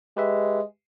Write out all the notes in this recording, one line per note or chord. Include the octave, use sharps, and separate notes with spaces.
G#3 G4 B4 E5